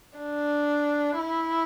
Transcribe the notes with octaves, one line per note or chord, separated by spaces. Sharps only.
D4
E4